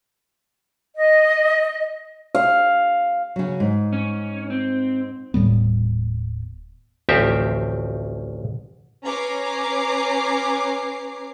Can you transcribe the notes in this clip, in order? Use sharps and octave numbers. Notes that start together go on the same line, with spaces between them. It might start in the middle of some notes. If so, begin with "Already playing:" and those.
D#5
F5
C#3 F#3
G#2
C#4
C4
D#1 A2 G3 B3
A1 D2 F3 C4 G4 E5
C#4 B4 C#5 A#5 D6 C7